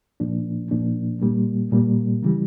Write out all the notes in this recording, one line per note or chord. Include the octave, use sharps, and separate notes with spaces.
A#2 F3 A#3 D4
A#2 F3 A#3 D4
A#2 G3 A#3
A#2 G3 A#3
C#3 E3 G3